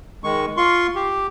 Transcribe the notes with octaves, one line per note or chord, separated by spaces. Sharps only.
D#3 G#3 C#6
F4 C6 C#6
G4